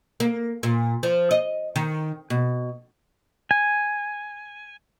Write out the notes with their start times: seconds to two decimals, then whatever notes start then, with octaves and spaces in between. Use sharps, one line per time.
0.20 A#3
0.63 A#2
1.03 F3
1.31 D#5
1.76 D#3
2.30 B2
3.51 G#5